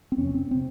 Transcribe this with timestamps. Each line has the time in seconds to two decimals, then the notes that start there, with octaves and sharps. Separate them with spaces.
0.12 C4
0.18 F2 C3 C#4
0.34 C4
0.51 C3 C4